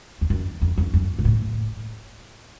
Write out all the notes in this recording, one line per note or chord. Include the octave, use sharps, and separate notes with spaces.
F2
F#2
F2
F2
F#2
A#2
A2